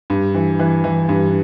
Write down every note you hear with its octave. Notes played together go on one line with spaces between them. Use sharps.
G2
E3
E3
E3
G2